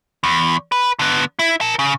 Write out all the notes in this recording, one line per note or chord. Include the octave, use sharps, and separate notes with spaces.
E2
B4
D3 B3
E4
A#4 A5
C#3